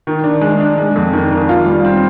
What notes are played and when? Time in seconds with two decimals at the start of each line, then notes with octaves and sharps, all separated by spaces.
0.07 D#3
0.24 D4
0.41 G#3
0.60 D4
0.78 G#3
0.95 F2
1.13 D#3
1.31 D#3
1.49 F4
1.67 G3
1.84 C4